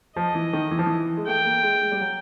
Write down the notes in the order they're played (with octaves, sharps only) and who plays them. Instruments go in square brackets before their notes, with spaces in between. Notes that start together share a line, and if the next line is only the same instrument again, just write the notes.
[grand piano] F3 [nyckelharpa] D#5
[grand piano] E3
D#3
E3
F3
E3
G#3
[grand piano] A3 [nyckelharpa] G5
[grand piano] A#3
G#3
G#3
G3
F#3